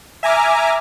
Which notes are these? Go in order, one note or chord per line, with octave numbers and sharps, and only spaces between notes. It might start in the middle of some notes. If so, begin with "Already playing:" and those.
E5 G#5 A#5 D6 F6